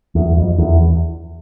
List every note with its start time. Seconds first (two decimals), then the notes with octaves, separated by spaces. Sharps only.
0.15 E2
0.37 F2
0.58 E2